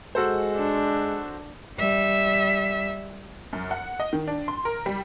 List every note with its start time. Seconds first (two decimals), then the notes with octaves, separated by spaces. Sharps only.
0.15 G#3 F#4 A4 C5
0.57 D4
1.78 G3 E5
3.53 F#2
3.71 F#5
4.00 D#5
4.13 D#3
4.28 D4
4.48 C6
4.65 A#4
4.86 G3